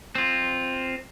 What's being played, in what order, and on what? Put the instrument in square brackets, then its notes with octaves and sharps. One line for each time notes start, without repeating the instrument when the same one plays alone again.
[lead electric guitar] C4 F4